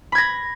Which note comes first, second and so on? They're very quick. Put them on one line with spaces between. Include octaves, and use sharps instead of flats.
B5 G#6 A#6